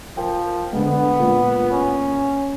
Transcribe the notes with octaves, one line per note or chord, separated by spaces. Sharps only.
F3 A#4 G5
D3 G#3 B3
A#2 G#3
C#4